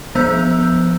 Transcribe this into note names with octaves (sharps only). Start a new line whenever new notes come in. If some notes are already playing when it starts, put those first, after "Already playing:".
F3 B3 C5 E6 G6